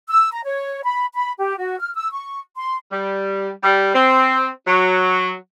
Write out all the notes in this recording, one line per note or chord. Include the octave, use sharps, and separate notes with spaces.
E6
A#5
C#5
B5
B5
G4
F#4
F6
E6
C#6
C6
G3
G3
C4
F#3